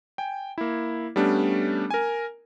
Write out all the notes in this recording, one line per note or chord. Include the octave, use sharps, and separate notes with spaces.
G5 G#5
A#3 E4
G3 A3 B3 C#4 D4 G4
A#4 G#5